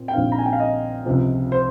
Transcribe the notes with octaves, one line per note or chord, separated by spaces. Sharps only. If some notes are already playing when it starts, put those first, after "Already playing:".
Already playing: A#2 C4
G5
A#1 A#2 F3 C4 D#4 F5
A#5
G#5
G5
F5
D#5
C#2 C3 F3
C5